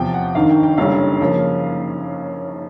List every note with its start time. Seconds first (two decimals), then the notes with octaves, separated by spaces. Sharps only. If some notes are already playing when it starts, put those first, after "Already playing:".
Already playing: E2 C3 F3 G5
0.14 F#5
0.35 G#1 G2 D#3 F5
0.50 G5
0.63 G5
0.78 F#1 F#2 D3 G3 F5
1.21 C#3 F3 A#3